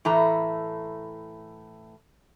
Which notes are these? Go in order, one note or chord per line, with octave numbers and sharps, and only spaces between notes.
A2 E3 A3 A#5